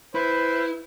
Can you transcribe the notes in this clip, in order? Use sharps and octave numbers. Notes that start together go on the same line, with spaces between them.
E4 B4 C5